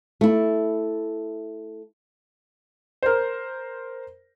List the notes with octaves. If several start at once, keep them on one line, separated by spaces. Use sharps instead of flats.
A3 E4
A#4 C5